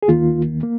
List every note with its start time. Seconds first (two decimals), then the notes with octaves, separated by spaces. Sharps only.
0.03 G#4
0.08 D#2 D#3 A#3 F4
0.63 A#3